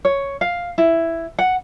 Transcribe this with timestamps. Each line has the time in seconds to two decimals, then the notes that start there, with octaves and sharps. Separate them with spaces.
0.05 C#5
0.41 F5
0.78 E4
1.39 F#5